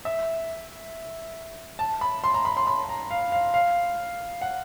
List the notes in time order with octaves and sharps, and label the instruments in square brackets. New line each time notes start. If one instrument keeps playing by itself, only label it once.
[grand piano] E5
A5
B5
C6
A#5
B5
C6
B5
A#5
F5
F5
F5
F#5